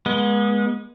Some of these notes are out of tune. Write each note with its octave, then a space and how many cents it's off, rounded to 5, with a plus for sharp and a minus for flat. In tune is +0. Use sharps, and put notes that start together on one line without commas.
G#3 +0 B3 -40